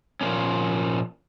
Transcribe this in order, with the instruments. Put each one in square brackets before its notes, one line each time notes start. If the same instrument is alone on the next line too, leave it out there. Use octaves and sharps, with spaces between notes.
[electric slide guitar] A#2 F3 A#3 C#4